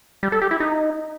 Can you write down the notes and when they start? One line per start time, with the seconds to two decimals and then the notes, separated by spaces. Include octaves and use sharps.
0.23 G3
0.32 A4
0.42 G4
0.51 E4
0.60 D#4